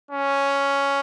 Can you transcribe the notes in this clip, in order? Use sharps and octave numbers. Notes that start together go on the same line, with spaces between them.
C#4